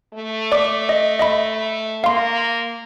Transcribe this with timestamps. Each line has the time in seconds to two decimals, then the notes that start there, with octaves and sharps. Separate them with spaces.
0.15 A3
0.52 D5 D6
0.89 D#5
1.19 D#5 E5 B5
2.04 A#3 F5 C6